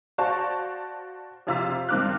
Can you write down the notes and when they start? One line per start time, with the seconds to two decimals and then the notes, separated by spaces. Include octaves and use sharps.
0.18 F#4 C5 D5 F5 A5 C#6
1.47 F2 C3 F4 A#5 E6 B6
1.89 G2 D#3 C4 D6 F6 F#6